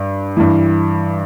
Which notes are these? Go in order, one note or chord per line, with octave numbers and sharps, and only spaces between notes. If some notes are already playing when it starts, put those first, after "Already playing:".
Already playing: G2
G2 E3